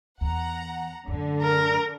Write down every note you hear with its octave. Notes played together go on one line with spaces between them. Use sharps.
E2 F#5 A#5
F#2 A2 D3
A#4